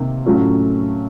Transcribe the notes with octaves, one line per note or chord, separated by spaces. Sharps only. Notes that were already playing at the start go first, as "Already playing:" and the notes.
Already playing: C3 D#3 A#3
A2 F#3 A3 C#4 F4